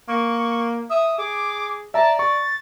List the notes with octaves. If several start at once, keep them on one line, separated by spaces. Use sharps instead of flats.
A#3 C#6
E5 D#6
G#4 D6
D5 E5 A5 A#5
C#6 A6